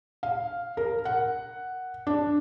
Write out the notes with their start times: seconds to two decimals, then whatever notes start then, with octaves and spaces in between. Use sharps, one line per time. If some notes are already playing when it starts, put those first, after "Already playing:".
0.23 F5
0.77 A#4
1.05 F#5
2.07 D4